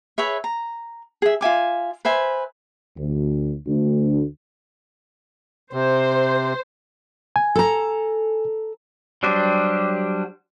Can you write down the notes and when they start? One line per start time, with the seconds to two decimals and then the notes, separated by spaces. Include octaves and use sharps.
0.18 G#4 B4 C#5 E5
0.44 A#5
1.22 G#4 E5
1.41 F4 E5 G#5 D6
2.05 B4 C5 E5 G#5
2.97 D2
3.66 D2
5.73 C3 C5
7.36 G#5
7.56 A4 A#5
9.23 F#3 G3 D4 G4 C5